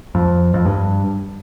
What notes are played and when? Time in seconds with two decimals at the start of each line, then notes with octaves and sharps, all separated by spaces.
0.15 F2
0.54 F2
0.65 G2